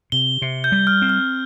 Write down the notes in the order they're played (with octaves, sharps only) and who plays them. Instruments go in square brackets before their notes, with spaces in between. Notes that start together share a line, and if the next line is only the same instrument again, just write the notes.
[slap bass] C3 [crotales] G7
[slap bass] C3
[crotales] G6
[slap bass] G3
[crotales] F6
[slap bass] C4
[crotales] F6